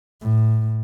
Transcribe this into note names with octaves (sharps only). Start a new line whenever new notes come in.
A2